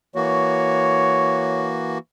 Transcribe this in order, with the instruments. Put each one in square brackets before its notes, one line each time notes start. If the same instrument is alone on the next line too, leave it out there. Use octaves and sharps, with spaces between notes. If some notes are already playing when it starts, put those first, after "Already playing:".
[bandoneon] E3 A#3 F#4 [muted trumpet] C#5